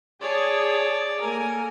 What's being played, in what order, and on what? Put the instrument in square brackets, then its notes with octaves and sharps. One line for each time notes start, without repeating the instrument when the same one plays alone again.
[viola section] G#4 A5 [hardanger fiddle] C#5 D5
[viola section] A#3 A4 A#4 [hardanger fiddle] G#5